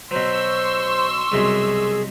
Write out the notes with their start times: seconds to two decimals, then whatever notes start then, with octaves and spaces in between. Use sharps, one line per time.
0.11 B2 F#3 C5 C6 C#6 E6
1.32 C2 F#2 B2 G#4